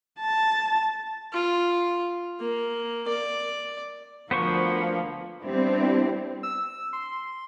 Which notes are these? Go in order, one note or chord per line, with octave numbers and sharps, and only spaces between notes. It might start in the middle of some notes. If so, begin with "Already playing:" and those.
A5
F4
A#3
D5
D2 F3 A#3 B3 C5 C#6
G3 B3 C4 D4 E4 G4
E6
C6